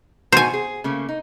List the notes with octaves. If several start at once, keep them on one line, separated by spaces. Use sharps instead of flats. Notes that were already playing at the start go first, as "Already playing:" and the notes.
B2 D#3 F#4 C5 G#5
G#4
C#3 A3 A#3
D#4